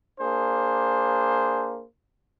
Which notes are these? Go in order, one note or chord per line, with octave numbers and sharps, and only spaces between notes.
A#3 D4 G#4 C5